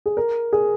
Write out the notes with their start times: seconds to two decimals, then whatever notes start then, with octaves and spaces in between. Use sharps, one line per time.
0.06 G#4
0.17 A#4
0.53 G#4